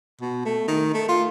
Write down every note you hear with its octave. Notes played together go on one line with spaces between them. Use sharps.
B2
A3
D#3
A3
F4